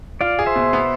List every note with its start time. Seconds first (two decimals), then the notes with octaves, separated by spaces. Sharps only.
0.21 F4 D5 F5
0.39 G#4
0.46 C5 E5
0.56 B2
0.73 B3